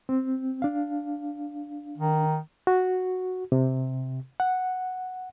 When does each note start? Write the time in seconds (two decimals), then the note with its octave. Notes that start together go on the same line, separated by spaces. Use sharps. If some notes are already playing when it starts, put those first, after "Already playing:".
0.09 C4
0.62 D4 F5
1.98 D#3
2.67 F#4
3.52 C3
4.40 F#5